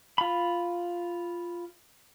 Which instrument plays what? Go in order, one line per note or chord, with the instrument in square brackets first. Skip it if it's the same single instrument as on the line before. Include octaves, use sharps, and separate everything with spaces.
[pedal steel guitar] F4 B5